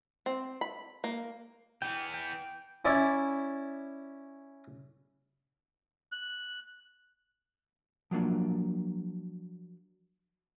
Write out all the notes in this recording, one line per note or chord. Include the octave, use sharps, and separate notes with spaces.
C4
B5
A#3
E3 B3 G5
G5
C#4 E4 D5
F#6
F3 F#3 A#3 D4